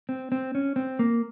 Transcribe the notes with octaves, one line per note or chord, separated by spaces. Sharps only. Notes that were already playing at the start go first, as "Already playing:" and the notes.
C4
C4
C#4
C4
A#3